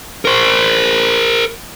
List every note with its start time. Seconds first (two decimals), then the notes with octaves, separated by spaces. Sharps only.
0.25 A#4 C5